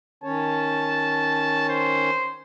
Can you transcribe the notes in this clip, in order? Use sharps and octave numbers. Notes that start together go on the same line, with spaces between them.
D#3 C#4 C#5 A5
C5